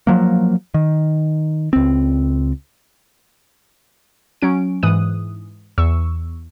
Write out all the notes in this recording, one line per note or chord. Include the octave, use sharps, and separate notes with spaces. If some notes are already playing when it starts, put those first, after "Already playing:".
F3 F#3 A#3
D#3
C#2 C4
F#3 C#4 D7
G#2 E3 D#6 F#6 D#7
E2 C#6 E6